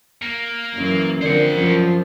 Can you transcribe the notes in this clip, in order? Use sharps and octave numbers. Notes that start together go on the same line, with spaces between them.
A#3
F#2 E3
D3 F3 C4 A#4 C5 D5 F#5
F#2 F3